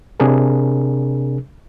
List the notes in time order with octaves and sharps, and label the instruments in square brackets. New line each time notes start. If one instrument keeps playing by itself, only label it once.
[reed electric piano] C3 D4 G#4 A#4